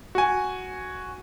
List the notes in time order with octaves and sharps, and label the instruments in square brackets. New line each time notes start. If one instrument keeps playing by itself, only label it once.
[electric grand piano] F#4 G#5